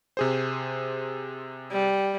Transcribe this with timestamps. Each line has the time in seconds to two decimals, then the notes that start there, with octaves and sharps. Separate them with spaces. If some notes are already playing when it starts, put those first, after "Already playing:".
0.17 C3 G#4 C5
1.71 G3